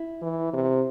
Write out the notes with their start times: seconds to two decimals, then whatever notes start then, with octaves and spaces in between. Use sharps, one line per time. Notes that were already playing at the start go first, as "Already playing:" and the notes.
Already playing: E4
0.22 E3
0.53 C3